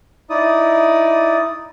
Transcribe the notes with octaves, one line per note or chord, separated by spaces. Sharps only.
D#4 E4 D5 D#6